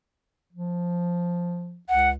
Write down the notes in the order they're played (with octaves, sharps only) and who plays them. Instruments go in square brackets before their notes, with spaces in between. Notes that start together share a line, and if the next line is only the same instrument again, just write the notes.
[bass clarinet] F3
[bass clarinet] C#2 [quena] F#5